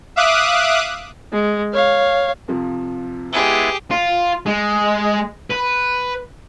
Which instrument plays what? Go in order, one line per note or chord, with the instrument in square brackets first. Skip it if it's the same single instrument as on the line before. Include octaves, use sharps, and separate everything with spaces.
[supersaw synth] E5 F5 D6 D#6 F#6
[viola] G#3
C#5 F5
[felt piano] F2 C3 F3
[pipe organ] G#3 B3 E4 [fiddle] G4 G#4
[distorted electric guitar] F4
G#3
B4